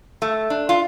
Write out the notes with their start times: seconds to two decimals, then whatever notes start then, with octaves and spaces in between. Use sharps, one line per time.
0.22 A3
0.50 D4
0.69 F4